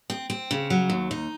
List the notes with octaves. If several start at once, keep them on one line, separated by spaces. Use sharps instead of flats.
C4
C4
C#3
F#3
D#2
D#4